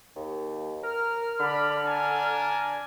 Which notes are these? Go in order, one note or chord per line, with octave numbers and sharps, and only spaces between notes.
D#2
A#4 F6
D3 D5 B5
D4 G#5 A#5